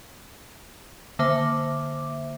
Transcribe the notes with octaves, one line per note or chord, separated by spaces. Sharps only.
D3 A#3 C5 E5 D6